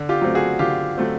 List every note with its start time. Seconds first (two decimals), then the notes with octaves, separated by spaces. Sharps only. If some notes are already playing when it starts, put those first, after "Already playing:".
Already playing: D3
0.09 F4 G4
0.22 F#3 A3 C4
0.35 F#4 G#4
0.59 D3 F4 G4
0.97 F#3 A3 C4